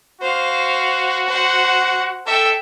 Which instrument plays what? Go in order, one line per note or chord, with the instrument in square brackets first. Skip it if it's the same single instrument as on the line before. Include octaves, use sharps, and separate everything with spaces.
[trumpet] F#4 [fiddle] C5 F5
[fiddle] C5 F#5
[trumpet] A4 [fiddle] E5 G5